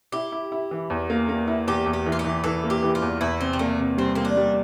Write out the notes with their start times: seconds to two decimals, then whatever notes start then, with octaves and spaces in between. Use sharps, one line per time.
0.12 E4 G4
0.32 E4
0.52 E4
0.71 E3
0.90 E2
1.10 A#3
1.29 A#3
1.48 E4
1.68 E2 G4
1.86 E2
1.93 G4
2.06 E3
2.12 F4
2.19 G4
2.24 E3
2.44 E3 A4
2.64 A#3
2.70 G4
2.83 E3
2.95 F4
3.02 E2
3.21 E2 E4
3.40 C3 C4
3.53 G3
3.59 A3 A#3
3.79 C3
3.98 G3 C4
4.15 A#3 C4
4.25 D4
4.37 G3